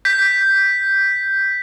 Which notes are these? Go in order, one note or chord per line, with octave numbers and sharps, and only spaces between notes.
G6 B6